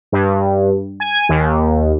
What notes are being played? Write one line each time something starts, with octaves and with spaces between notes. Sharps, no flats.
G2
G#5
D#2